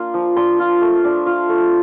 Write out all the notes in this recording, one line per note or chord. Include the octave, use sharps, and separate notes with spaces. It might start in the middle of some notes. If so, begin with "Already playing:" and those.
Already playing: A#3 D4 F4
F3
D4 C6
F4
A3
D4
F4
A3